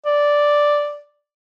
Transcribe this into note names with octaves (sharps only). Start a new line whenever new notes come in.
D5